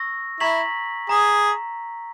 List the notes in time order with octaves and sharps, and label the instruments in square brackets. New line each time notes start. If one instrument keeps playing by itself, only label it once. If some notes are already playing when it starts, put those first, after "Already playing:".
Already playing: [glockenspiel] C#6 E6 A#6
[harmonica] E4 [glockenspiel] A#5 C#6 G#6 B6 F#7
[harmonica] G#4 [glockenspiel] A#5